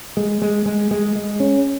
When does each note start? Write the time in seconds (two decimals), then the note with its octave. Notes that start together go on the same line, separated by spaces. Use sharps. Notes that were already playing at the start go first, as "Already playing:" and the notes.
0.17 G#3
0.42 G#3
0.66 G#3
0.91 G#3
1.16 G#3
1.40 C#4